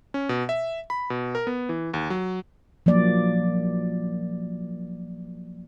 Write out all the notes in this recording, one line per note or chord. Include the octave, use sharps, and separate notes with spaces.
C#4
B2
E5
B5
B2
A#4
B3
E3
D#2
F#3
F3 F#3 A#3 D5